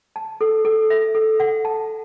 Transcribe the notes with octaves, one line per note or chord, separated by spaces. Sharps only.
A5
A4
A4
E5
A4
F#5
A5